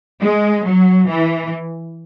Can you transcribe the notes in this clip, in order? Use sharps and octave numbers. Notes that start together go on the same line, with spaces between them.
G#3
F#3
E3